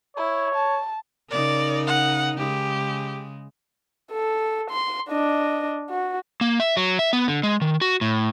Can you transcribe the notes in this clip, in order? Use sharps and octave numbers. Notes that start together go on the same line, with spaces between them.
E4 C#5
A5
C#3 D#4 A#4 D5
F#5
C#3 G#3 G4
A4
C6
D4 D#5
F#4
A#3
E5
F#3
E5
B3
D3
G#3
D#3
F#4
A2